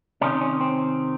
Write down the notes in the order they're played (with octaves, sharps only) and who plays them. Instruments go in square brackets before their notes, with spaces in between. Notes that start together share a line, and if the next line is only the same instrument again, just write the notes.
[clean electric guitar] C3 D#3 C#4
C#4
C4